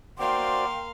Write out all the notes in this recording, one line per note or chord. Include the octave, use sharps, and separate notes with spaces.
A#3 F#4 C5 D5 F5 G5 C6